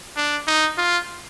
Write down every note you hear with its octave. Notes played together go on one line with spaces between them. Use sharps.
D4
D#4
F4